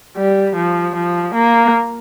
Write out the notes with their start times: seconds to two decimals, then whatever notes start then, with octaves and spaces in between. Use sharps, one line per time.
0.17 G3
0.56 F3
0.96 F3
1.35 A#3